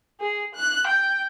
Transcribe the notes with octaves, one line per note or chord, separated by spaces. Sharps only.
G#4
F#6
G5